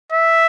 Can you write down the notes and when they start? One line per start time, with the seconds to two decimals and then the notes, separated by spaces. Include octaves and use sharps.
0.12 E5